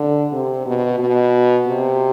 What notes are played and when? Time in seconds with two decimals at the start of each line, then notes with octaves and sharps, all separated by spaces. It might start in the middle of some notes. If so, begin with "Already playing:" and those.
Already playing: D3
0.32 C3
0.66 B2
0.99 B2
1.67 C3